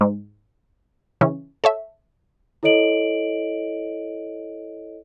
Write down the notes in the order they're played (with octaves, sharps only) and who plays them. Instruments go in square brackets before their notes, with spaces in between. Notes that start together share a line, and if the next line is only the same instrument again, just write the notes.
[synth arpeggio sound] G#2
C#3 E3 C#4
A4 C#5 E5
[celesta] E4 A4 C#5 D#5 D7 F#7